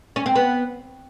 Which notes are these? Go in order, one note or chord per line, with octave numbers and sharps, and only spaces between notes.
C#4
C4
B3